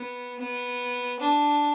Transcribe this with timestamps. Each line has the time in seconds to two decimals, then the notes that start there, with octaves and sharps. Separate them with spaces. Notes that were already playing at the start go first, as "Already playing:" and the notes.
Already playing: B3
0.39 B3
1.20 D4